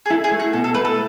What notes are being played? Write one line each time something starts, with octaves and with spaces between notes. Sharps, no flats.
G#4
E4 A4
G#4
A3
F#4
B2 A4
A4
A3 B4
A4